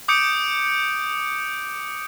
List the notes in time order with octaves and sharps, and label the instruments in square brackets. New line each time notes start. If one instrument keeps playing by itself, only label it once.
[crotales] D6 D#6 G6 C#7 D7